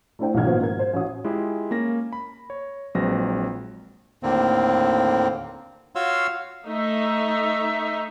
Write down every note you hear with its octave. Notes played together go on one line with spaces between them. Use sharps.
A3 D4 E4 C5 G5
B1 G#2 E3 D#4 F6 G#6
D#3 F3 A#3 B3 F#4 C5
G#2 A#4 G#6
C5
A1 F#4 C#5 D#6
G#3 E4 F4 G4 G#4
A#3 C#4 A#6
B5
C#5
A#1 F#3 G#3 C4 B4 A#6
D#2 A2 D3 A#3 C4
F4 F#4 C#5 F5 C6 E6
A3 D#4 E5